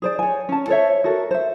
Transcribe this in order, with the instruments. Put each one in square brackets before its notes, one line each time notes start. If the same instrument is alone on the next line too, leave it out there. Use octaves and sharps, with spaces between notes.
[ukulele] G#4 C5 D5
C#5 G#5
C#4 A5
A4 C5 C#5 E5
F#4 A4 A#4
C5 E5